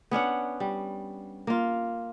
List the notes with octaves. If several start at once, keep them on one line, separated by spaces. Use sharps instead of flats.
B3 C#4 D4 F#5
G3
A#3 F4